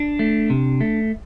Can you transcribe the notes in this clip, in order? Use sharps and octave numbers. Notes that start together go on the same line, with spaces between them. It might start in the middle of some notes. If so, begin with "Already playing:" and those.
Already playing: D4
A3
C3
A3